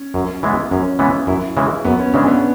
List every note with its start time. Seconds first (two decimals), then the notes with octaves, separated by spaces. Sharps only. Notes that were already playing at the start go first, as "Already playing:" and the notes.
Already playing: C#4
0.14 F#2
0.43 C#3 E3 G#3 B3
0.71 F#2 C#4
0.99 C#3 E3 G#3 B3
1.27 F#2 E4
1.57 C#3 E3 G#3
1.85 F#2 B3
1.99 C#4
2.14 C#3 E3 G#3 D4
2.27 B3